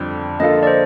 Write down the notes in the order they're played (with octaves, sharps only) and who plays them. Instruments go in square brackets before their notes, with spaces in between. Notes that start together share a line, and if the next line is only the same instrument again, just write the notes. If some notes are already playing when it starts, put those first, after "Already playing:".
Already playing: [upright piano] F2 D3 G3
[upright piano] D3 F3 A#3 F4 A4 [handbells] D#5
[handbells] D5
C5